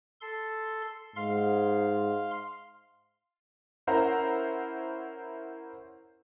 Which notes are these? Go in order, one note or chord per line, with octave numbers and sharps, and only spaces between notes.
A4 C6
G#2 F5 C6
C#4 E4 A#4 C5 F#5 A#5